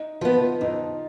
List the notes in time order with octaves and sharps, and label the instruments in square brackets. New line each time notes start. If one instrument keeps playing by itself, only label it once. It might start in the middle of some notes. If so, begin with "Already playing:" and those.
Already playing: [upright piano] D#4
[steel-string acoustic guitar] F3 B3 [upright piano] F4
[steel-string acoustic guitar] F2 [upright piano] D#4